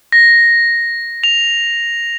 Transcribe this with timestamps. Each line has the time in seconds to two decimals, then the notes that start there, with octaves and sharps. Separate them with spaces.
0.12 A#6
1.24 F7